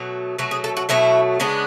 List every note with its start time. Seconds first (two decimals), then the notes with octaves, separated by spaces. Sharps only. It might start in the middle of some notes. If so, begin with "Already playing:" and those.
Already playing: B2 F#3 A3
0.38 B2 F#3 A3 F#4
0.51 G#4
0.64 A4
0.77 F#4
0.89 B2 F#3 A3 E4
1.40 C#3 G#3 B3 D4